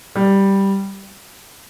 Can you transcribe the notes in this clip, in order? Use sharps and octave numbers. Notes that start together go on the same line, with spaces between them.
G3